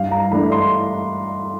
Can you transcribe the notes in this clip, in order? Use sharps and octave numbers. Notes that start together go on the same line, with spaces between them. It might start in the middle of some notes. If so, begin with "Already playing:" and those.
Already playing: G2 F5
A#5
E3 A3 D4 B5
C6